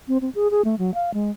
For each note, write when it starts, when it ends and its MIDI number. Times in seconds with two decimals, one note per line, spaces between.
0.08 0.18 60
0.22 0.30 60
0.35 0.51 68
0.51 0.62 68
0.65 0.75 57
0.79 0.94 54
0.94 1.11 77
1.14 1.31 56